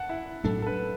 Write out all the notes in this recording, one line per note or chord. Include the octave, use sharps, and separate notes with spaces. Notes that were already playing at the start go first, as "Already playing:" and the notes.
Already playing: F#5 A5
E4
A2 F#3 A3 D4 A4
A4
B4